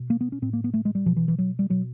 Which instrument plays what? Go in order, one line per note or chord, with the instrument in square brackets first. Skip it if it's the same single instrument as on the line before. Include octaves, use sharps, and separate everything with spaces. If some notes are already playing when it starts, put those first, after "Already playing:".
Already playing: [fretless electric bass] B2
A#3
B3
C#4
A2 C4
A#3
B3
A3
G#3
G3
B2 F3
E3
E3
F#3
G3
B2 F#3